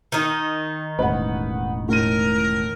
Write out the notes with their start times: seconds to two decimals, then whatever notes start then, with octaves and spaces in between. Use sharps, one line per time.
0.12 D#3 D#4
0.99 E1 A1 B4 F#5
1.89 A2 A#4 D#7